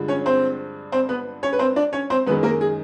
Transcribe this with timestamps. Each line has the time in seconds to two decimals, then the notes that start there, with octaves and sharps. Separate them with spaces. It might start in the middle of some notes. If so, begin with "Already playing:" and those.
Already playing: G2 D3 F3 G#3
0.08 C#4 C#5
0.26 C4 C5
0.92 C4 C5
1.09 B3 B4
1.43 C#4 C#5
1.53 B4
1.59 C4 C5
1.76 D4 D5
1.93 C#4 C#5
2.10 C4 C5
2.26 F#2 D#3 G#3 B3 B4
2.43 A#3 A#4
2.61 G#4